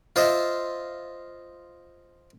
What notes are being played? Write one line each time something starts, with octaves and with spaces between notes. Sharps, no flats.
F4 C5 D#5 E5